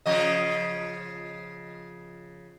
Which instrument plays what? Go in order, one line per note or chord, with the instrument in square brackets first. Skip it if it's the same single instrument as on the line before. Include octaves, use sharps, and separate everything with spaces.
[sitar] C#3 F3 D#5